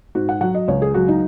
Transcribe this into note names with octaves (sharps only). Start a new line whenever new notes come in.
G#2 F#4
F#5
F#3 F#5
D#5
C#2 C#5
G#4
F#3 F#4
D#4